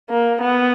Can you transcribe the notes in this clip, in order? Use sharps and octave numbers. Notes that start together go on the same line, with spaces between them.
A#3
B3